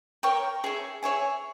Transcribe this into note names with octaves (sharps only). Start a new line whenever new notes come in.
A#4 C#5 G5 C#6
G#4 C#5 E5 G#5
G#4 C#5 E5 G#5